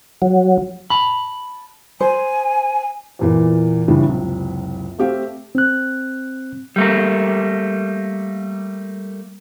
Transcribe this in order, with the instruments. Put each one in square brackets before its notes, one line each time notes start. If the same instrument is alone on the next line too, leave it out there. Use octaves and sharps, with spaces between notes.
[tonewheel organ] F#3
[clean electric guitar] A5 B5
[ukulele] C5 [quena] G#5
[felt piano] E2 A#2 E3
A2 C#3 E3 G3 D4
F#1 C#2 C3
A3 C4 G4 E5 F5
[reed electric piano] C4 F#6
[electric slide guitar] G3 A3 A#3